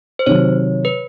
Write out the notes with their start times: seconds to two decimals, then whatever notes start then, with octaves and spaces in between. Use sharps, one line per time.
0.19 C5
0.26 C3 D#3 F#3 C#5
0.85 B4